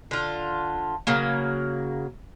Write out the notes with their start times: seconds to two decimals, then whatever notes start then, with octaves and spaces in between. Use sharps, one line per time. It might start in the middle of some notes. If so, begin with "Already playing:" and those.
0.11 D3 F4
1.07 C#3 F#3 A#3